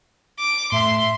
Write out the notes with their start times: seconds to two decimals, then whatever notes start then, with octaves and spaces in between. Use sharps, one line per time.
0.39 D6
0.72 A2 E5 C6